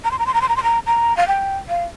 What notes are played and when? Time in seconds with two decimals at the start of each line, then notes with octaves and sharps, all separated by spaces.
0.04 A#5
0.11 C6
0.19 A#5
0.26 C6
0.34 A#5
0.41 C6
0.49 A#5
0.56 C6
0.63 A#5
0.86 A#5
1.17 F5
1.28 G5
1.69 F5